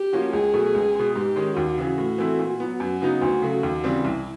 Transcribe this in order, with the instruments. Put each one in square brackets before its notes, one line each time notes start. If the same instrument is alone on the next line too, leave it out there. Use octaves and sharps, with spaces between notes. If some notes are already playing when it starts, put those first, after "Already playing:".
Already playing: [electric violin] G4
[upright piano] F3 A#3 C#4 F#4
[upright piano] C#2 [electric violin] G#4
[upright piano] B2 F#3 A3
C#2
B2 G#3
[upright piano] G#2 [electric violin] G4
[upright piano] D#3 G#3 C#4
[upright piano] D#2 [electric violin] F#4
[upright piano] C#3 E3
A2
E3 A3 C4 E4
A#2
F#3 B3
[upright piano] F#2 [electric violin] F#4
[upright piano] C#3 F#3 B3 D#4
[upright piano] D2 [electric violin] F#4
[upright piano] C#3 F#3 A3
D#2
C#3 E3 G3 C4
[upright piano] C2 [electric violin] E4